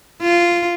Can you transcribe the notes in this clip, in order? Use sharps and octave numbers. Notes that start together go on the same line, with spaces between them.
F4